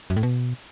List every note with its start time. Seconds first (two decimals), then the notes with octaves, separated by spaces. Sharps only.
0.10 F#2
0.16 A2
0.23 B2